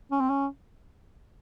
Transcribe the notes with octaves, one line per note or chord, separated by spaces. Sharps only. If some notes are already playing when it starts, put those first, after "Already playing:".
C#4
C4
C#4